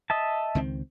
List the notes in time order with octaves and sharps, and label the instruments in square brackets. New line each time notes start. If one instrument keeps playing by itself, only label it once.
[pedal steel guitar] D#5 E5 A5
[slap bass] C#2 D#3 C4